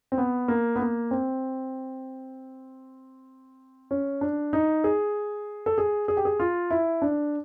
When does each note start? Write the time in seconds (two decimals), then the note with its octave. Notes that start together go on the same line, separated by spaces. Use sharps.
0.12 C4
0.18 B3
0.48 A#3
0.76 B3
0.80 A#3
1.11 C4
3.91 C#4
4.21 D4
4.53 D#4
4.84 G#4
5.66 A4
5.78 G#4
6.08 G#4
6.17 G4
6.25 G#4
6.40 F4
6.71 E4
7.02 D4